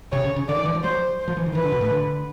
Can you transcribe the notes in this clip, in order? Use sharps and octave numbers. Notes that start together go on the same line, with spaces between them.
C3 C#5
C#3
C#3
D3 D5
D#3
E3
F3
F#3 C5
C5
F3
E3
D#3
E3 B4
D3
B2
A2
D3